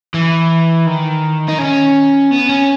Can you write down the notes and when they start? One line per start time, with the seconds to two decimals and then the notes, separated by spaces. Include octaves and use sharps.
0.14 E3
0.86 D#3
1.48 D#4
1.59 C#4
2.31 B3
2.49 C#4